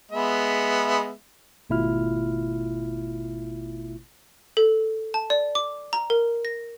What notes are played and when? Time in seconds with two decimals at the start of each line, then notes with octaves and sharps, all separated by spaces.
0.12 G#3 B3 E5
1.70 G#1 B2 A3 E4 F4 F6
4.57 A4
5.14 A5
5.30 D5
5.55 D6
5.93 A#5
6.10 A#4
6.45 A#6